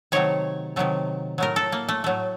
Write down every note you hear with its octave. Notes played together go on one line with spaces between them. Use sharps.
C3 D#3 F#3 A3 C#5
C3 D#3 F#3 A3
A2 F#3 A3 A#4
A4
A#3
A3
A2 F#3 A3